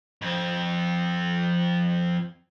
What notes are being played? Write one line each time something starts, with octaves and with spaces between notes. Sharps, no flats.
F2 C4